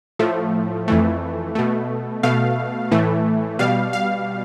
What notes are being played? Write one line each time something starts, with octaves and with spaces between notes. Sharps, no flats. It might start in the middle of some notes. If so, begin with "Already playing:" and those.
A2 F3 A3
F2 E3 A3
B2 A3
B2 A3 F5
A2 E3 A3
B2 G3 F5
F5